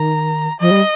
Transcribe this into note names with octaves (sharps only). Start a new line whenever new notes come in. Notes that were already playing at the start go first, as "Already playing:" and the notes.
Already playing: D#3 A#5
F3 D#5
G3